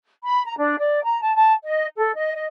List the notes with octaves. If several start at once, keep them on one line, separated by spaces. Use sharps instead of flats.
B5
A#5
D4
D5
A#5
A5
A5
D#5
A4
D#5
D#5